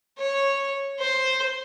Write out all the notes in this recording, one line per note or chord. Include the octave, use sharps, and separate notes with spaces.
C#5
C5